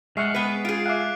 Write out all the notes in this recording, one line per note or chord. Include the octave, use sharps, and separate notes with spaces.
G#3 E5 F#5 C#6 F6 C7
B3 B4
F4 G#4 D7
E5 F5 D6 F#6